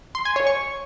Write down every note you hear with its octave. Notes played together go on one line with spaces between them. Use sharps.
C6
G#5
C#5
C#6